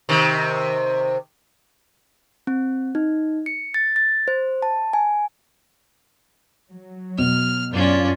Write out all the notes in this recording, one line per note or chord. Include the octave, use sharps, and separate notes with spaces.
C3 D#3
C4
D#4
C#7
A6
A6
C5
A5
G#5
F#3
B2 F6
F#2 C#4 D4 F4 D5